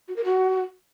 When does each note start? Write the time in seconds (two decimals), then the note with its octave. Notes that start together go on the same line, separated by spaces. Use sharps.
0.08 F#4
0.16 A#4
0.24 F#4